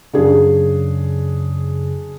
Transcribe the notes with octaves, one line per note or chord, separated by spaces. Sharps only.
F#2 C#3 D4 G#4